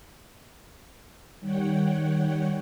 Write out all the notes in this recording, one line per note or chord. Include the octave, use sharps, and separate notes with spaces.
D#3 G3 C#5 F#5 G5